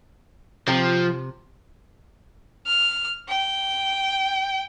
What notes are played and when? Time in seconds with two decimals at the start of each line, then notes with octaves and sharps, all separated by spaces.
0.68 C3 F3
2.67 F6
3.28 G5